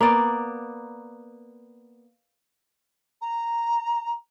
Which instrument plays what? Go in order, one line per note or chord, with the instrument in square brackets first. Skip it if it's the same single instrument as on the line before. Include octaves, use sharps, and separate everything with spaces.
[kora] A#3 B3 D5
[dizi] A#5